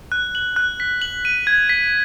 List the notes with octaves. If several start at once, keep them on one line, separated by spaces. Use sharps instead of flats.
F#6
F#7
F#6
B6
F#7
D#7
G#6
B6